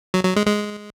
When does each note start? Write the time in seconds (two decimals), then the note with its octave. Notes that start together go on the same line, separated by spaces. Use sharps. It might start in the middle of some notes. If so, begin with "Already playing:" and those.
0.14 F#3
0.24 F#3
0.36 G#3
0.46 G#3